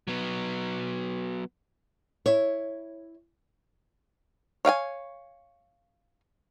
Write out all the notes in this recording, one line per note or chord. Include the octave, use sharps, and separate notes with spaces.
F#3 B3
E4 C#5
C#5 F5 G5 G#5